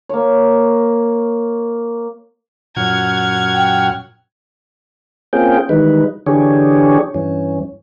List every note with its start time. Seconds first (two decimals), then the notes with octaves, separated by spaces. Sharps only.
0.09 A#3 C#5
2.76 F#2 A#2 F#5 F6 G#6
3.54 G5
5.33 A#3 C4 C#4 F4 G#4 G5
5.69 D#3 E3 G3 G#3 D#4 B4
6.26 D3 E3 D4 G4 G#4 C#5
7.14 G2 E3 C#4